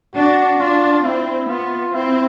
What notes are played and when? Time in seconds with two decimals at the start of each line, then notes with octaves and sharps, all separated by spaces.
0.15 D4 F#4
0.60 D4 F4
1.05 C4 E4
1.49 B3 F4
1.94 C4 E4